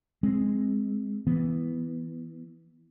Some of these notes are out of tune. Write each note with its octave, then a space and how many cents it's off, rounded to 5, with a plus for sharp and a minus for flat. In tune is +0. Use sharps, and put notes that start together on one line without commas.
G#3 +0 C4 +0
E3 +0 B3 +0